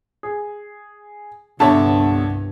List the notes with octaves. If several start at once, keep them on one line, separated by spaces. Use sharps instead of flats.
G#4
C2 G2 D3 B3 C#5 E5 A5